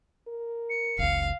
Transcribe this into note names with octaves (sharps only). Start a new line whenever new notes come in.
A#4
C#7
F#1 C#2 F5